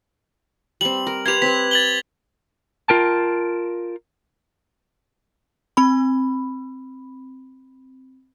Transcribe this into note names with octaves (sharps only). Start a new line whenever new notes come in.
G3 C4 F#7
A#4
G4 B4 C6 G#6 F7
C4 B4 B6
A6 F#7 G7
F4 A#4 G5 A5
C4 B5